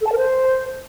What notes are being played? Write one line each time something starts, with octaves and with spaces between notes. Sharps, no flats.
A4
A5
A#4
C5